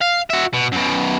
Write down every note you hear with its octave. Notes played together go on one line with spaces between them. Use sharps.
F5
F#4 E5
B2
F#2 B2